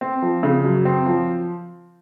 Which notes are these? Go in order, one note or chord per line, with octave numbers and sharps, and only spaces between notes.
C4
F3
C#3
F#2
C4
F3